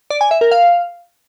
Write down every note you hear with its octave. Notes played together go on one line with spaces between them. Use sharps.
D5
G#5
E5
A#4
F5